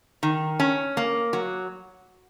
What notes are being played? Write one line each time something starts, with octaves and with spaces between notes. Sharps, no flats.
D#3
C#4
A#3
F#3